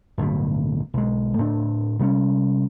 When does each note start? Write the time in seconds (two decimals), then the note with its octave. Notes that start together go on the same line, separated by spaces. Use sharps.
0.18 D1 B1 G2 B2
0.94 B1 G#3
1.38 A2 C4 D4
1.99 C3 G3 C4 C#4